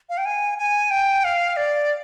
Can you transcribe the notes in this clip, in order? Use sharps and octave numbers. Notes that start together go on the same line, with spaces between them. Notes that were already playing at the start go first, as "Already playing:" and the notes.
F5
G5
G#5
G#5
G5
F5
D5